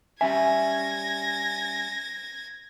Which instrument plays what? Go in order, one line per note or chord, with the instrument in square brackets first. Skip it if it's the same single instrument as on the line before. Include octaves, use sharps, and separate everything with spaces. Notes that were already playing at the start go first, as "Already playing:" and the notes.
[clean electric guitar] G3 C#4 E5 [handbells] G#5 [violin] G#6 A#6